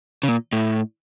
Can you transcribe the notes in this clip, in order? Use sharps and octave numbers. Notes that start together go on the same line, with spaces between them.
C#3
A#2
A2